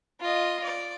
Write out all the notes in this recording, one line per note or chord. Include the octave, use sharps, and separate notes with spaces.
F4 D#5
D5